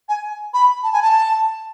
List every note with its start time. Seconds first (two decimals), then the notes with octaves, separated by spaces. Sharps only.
0.09 G#5
0.54 B5
0.83 A5
0.93 G#5
1.02 A5